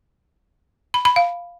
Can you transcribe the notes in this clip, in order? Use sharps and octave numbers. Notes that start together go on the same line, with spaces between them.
B5
B5
F5